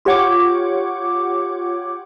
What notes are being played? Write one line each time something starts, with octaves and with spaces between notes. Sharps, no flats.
F4 G4 C#5 F#5 C#6 D6